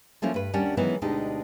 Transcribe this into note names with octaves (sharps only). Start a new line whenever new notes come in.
F3 A3 A#3 C#4 E4
G2 B4
D#2 G3 C#4 D4 F#5
D#3 E3 F#3 G#3 B3 C#4
D2 B2 G#3 D4 D#4 G4